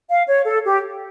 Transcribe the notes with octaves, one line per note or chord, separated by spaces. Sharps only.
F5
C#5
A4
G4